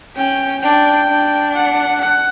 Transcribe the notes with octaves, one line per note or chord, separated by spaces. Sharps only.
C#4 G5
D4 G5
D4
F#5
F#5